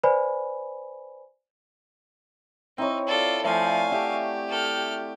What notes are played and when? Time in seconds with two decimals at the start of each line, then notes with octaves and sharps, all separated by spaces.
0.03 B4 C5 D5 G#5 B5
2.78 C4 D#4 E4 C#5
3.07 F4 A4 D5
3.45 F3 A3 D5 F5 G#5
3.91 F#4 G4 E5 A5
4.49 A4 F6